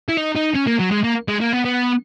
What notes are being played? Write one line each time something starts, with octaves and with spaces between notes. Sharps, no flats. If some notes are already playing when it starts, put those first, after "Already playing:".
E4
D#4
D#4
C#4
A#3
F#3
G#3
A#3
G#3
A#3
B3
B3